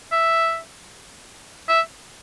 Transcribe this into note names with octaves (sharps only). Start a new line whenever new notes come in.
E5
E5